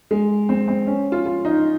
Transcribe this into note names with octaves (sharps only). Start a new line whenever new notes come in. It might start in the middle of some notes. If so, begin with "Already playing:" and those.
G#3
C4
C4
C#4
F4
F4
D#4